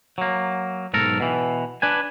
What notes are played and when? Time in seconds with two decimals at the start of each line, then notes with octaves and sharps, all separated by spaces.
0.18 F#3 A#3
0.93 B1 G#2 A4 A#4
1.20 B2 E3
1.82 D4 B4 G#5